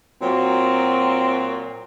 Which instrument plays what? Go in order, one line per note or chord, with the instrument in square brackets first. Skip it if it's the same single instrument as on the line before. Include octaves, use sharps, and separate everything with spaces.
[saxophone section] A#2 F#3 [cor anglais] C4